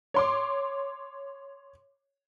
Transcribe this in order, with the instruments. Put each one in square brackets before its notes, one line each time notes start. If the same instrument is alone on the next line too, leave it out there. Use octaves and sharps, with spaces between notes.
[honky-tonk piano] C#5 C6 D6